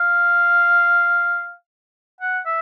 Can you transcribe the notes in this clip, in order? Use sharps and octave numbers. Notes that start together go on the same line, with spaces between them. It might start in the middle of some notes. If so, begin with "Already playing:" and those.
Already playing: F5
F#5
E5